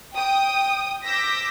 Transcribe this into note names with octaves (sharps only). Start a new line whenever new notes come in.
G5 D#6
D6 E6 G6 A#6 B6